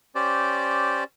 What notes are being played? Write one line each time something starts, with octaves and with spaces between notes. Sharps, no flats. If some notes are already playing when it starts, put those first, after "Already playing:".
C#4 G4 C5 D5